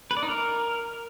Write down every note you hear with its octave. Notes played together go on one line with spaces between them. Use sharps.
B4
D5
D#4
A#4